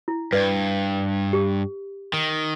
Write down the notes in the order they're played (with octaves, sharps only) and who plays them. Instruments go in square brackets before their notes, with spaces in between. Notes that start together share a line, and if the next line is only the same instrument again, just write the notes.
[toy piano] E4
[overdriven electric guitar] G2 [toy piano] B4 D5
[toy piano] G4
[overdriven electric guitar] D#3